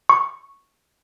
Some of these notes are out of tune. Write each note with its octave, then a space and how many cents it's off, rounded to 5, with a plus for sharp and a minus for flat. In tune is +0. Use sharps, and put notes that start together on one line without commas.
C#6 -5